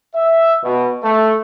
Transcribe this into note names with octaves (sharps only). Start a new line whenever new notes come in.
E5
B2
A3